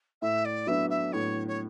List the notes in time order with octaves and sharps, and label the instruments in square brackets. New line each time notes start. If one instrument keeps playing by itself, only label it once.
[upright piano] A2 [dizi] E5
[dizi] D5
[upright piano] F#3 B3 D4 [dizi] E5
[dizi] E5
[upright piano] A2 [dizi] C#5
[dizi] C#5